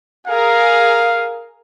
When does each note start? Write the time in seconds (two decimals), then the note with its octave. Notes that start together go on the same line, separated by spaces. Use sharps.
0.28 G#4 A#4 F5